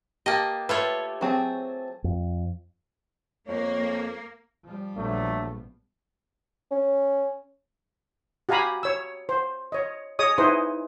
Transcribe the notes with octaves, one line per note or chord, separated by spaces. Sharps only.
A#3 G4 D#5 A5
A3 F4 B4 C#5
F#3 C4 G#4 G#5 A5
F2
F2 A#3 C#5
F3 G3
A#1 F#3 A3 B3 D4
C#4
F#4 G4 F5 G#5 A#5 B5
C#5 E6
C5
C#5 D#5
G#4 C#5 D#5 D#6
D#4 E4 G#4 B4 C5 D#5